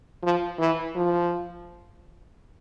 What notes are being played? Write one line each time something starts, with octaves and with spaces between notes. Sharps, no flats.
F3
E3
F3